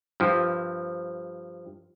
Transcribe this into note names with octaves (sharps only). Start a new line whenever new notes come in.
G2 F3